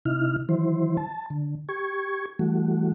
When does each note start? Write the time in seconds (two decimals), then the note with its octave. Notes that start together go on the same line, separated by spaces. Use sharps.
0.05 C3 D#4 E4 F6
0.49 D#3 E3 F#3 E4 C5
0.97 A5
1.30 D3
1.69 G4 C#6 G#6
2.39 E3 G3 A3 F#4